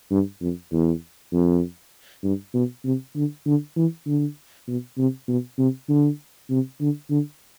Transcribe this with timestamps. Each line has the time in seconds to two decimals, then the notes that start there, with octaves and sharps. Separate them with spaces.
0.11 G2
0.41 F2
0.72 E2
1.33 F2
2.23 G2
2.54 B2
2.84 C3
3.16 D3
3.46 D3
3.76 E3
4.07 D3
4.68 B2
4.98 C3
5.28 B2
5.58 C3
5.89 D3
6.50 C3
6.81 D3
7.10 D3